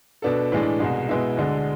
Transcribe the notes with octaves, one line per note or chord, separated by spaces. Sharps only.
B2 B3 D4 A4
A2 E3 G#3 D4
C2 B2 G#3
B2 G#3 B3 E4
D2 D3 G#3